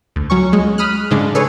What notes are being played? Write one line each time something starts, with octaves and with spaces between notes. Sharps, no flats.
D2
F#3 C#4 C#6
C#2 G#3
B5 D#6 F6 F#6
G#2 C#3 G#3 C#4 D4
G#4 A4 B4 C#5